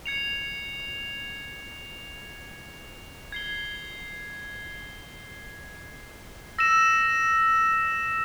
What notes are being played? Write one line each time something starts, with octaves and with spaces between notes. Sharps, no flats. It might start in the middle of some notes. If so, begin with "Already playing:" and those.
G#6 C#7 F7
G#6 C7 G7
E6 A#6 E7